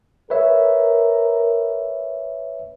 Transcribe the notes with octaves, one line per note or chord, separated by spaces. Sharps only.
A#4 B4 C#5 E5